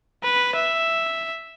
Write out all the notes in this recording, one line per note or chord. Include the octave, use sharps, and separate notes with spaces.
B4
E5